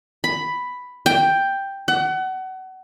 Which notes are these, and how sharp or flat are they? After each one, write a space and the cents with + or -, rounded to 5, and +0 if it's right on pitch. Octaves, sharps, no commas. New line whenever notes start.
B5 +5
G5 +5
F#5 +30